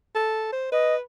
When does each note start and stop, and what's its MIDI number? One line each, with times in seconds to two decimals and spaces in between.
0.15 0.49 69
0.53 0.71 72
0.72 1.00 71
0.72 0.95 75